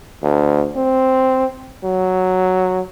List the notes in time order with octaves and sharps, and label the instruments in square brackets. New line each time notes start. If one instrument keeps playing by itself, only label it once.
[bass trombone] D2
C4
F#3